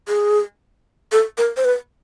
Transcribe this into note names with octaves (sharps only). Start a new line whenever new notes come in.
G#4
A4
A#4
C5
B4